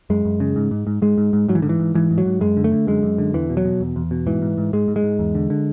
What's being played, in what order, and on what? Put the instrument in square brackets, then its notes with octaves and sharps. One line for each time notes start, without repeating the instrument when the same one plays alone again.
[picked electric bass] F#2 G#3
F#2
C#3
G#2
G#2
G#2
G#2 G#3
G#2
G#2
G#2 F#3
E3
G#2 D3
E3
G#2
G#2 E3
G#2
F#3
G#2
F#2 G#3
D3
A3
D3
F#2 G#3
F#2
D3
E2 E3
B2
F#3
B2
E2
E2
B2
G#2 E3
G#2
G#2
G#2 G#3
G#2
G#3
G#2
E2
D3
D3